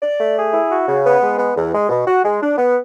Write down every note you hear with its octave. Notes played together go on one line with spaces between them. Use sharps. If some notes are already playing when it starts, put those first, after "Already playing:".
D5
A3
G#4
E4
F#4
C#3
B3
G#3
B3
E2
G#3
B2
F#4
G#3
D4
B3